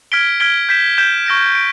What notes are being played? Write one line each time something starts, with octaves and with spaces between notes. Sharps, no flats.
F6 G#6 B6 D7 G7
F6 G#6 B6 D7 G7
G6 B6 E7
G6 B6 E7
C#6 F6 A#6 D7
D7